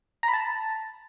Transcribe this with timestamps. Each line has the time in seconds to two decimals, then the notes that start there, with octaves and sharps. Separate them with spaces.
0.23 A#5
0.28 B5
0.33 A5